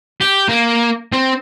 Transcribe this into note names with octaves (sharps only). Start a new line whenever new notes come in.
G4
A#3
C4